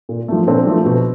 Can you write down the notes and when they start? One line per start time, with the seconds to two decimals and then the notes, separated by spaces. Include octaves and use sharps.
0.09 A#2
0.28 F3 A3
0.47 A#2 C4 D4
0.67 F3 A3
0.86 B2